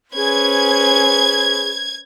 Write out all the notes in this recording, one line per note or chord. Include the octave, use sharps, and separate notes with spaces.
C#4 G#4 B4 C5 G#6